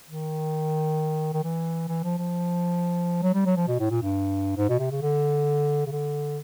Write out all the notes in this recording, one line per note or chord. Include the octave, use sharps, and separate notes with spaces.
D#3
D#3
E3
E3
F3
F3
F#3
G3
F#3
F3
B2
A2
A#2
G2
G#2
B2
C3
C#3
D3
C#3
D3